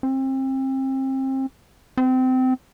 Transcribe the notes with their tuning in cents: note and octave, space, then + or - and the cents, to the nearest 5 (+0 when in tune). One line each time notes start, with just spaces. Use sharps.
C4 +30
C4 -25